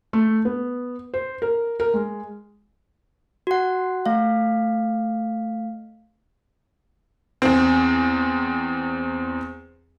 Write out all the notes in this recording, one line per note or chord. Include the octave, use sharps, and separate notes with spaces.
A3
B3
C5
A#4
A#4
G#3
F#4 F#5
A3 F5
E2 C4